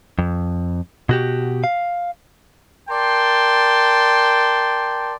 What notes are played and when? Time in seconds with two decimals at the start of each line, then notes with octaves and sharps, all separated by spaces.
0.19 F2
1.09 B2 F#4 G4
1.64 F5
2.89 A#4 D5 G5 A5 C6